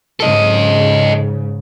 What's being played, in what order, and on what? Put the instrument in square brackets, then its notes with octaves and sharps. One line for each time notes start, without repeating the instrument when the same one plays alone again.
[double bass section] G#2 C#3 [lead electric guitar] A4 D#5